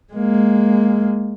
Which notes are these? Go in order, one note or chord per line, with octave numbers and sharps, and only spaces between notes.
G#3 A#3